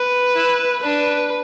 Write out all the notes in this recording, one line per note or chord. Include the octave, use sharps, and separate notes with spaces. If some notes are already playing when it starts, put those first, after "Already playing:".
Already playing: B4
E4
D4 B4